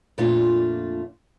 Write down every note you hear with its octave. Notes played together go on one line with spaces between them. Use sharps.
F2 A#2 A3 D4 F4